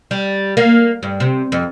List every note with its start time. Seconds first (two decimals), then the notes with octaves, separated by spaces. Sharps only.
0.11 G3
0.57 A#3
1.03 G2
1.20 C3
1.52 F2